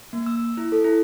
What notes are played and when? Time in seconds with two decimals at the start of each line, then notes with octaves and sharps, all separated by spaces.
0.13 A#3
0.26 E6
0.57 E4
0.72 A4
0.84 E4